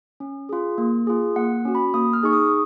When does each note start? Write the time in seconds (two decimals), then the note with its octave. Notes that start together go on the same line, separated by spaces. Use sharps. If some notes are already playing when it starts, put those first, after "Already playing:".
0.20 C#4
0.49 F4 G#4
0.78 A#3
1.07 F4 G#4
1.36 A#3 F#5
1.65 C#4 F#4
1.75 B5
1.94 A#3 D#6
2.13 F6
2.23 D#4 G#4 C#6
2.33 D#6